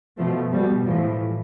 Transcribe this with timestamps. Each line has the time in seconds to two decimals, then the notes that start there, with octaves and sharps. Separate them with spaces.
0.18 B2 F3 A3
0.52 B2 G3
0.85 A2 E3 F3